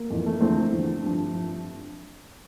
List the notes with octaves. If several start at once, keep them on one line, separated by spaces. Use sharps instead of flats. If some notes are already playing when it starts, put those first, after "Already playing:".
Already playing: A#3
F2 E3
A3
A#3
E2 D3 F3 A3 C4
E2 D3 F3
G2 F3
G2 F3